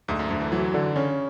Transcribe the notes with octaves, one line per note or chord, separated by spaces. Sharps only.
D2 G#2
F#2
D2 D3
E3
E3 F#3
D3
C#3 C#4